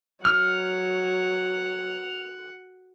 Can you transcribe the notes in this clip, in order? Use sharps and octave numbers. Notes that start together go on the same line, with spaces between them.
F#3 F#5 F6